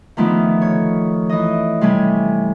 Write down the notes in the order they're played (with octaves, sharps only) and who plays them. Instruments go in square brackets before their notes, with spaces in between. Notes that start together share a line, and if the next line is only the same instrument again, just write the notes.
[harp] D3 D#3 F3 A3 B3
C#5
E3 D#5
C3 G3 A3 C#4 G#5